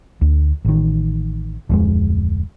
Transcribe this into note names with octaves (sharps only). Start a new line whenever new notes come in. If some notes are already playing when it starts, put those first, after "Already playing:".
D2
A1 D#3
D1 F2 G#3